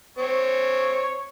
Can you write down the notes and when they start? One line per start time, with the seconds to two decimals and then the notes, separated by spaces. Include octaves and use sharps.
0.18 C4 C#5